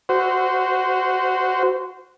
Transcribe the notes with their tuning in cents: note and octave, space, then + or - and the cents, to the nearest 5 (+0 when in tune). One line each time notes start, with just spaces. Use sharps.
F#4 +0 C5 -20